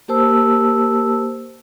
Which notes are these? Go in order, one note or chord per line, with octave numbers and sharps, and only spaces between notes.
A#3 G4 A#4 C5 A5 E6